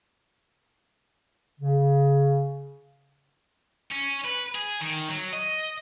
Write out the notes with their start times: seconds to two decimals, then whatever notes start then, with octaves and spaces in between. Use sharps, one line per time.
1.60 C#3
3.92 C#4
4.25 B4
4.55 G#4
4.81 D#3
5.09 F#3
5.33 D#5